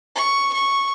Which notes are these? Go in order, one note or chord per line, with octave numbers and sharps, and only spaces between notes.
C#6
C#6